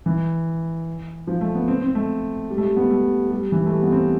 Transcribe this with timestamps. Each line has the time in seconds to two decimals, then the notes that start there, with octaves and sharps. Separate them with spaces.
0.06 E3
1.27 F3
1.41 A3
1.55 B3
1.68 C4
1.82 C4
1.95 A3
2.50 G3
2.58 A3
2.63 G3
2.77 B3
2.91 A3
3.31 G3
3.52 E3
3.66 A3
3.72 G3
3.83 B3
3.92 C4